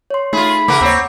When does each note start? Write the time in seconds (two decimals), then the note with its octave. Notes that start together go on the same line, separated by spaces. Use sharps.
0.10 C#5 C6
0.33 A3 D#4 F4 G#4 B5
0.68 C#3 A3 A#4 B4 F#5 A#5 D6
0.81 D#2 C4 C#5